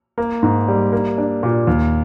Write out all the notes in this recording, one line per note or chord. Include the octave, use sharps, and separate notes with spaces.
A#3
G#2
G3
A#3
D4
A#2
D#2